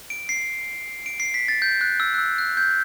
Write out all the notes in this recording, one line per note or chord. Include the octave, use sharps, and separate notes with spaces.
D7
C7
D7
C7
B6
A6
G6
F#6
E6
F#6
E6
F#6
G6